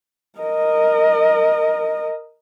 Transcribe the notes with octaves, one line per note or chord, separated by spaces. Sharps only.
A#4 D#5